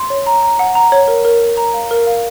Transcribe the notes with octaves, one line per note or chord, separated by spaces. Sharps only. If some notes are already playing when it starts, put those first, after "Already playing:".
Already playing: C6
C#5
A#5
A#5
F#5
A#5
C#5
A#4
A#4
A#4
A#5
F5
A#4
F5